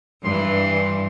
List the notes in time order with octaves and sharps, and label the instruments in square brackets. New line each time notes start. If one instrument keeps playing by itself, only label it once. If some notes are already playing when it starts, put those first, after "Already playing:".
[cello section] G2 E3 [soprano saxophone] C6